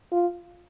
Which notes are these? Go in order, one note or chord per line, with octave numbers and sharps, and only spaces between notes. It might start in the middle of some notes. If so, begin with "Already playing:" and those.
F4